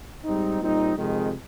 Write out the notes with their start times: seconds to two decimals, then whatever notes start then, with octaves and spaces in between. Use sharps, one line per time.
0.24 G#2 G3 C4 D#4
0.60 A#2 G3 C4 D#4
0.96 F2 C3 D#3 G#3